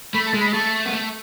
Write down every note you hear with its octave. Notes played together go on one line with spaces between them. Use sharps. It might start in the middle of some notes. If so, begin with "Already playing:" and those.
A3 B5
A5
G#3
B5
A3 A5
B3
A3